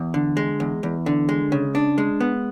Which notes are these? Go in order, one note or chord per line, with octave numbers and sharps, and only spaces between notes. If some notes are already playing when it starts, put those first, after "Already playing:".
Already playing: E2
D3
G#3
E2
E2
D3
G#3
C#3
D4
G#3
B3